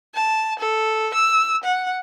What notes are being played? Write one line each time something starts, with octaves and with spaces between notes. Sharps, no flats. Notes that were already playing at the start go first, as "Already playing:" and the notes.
A5
A4
E6
F#5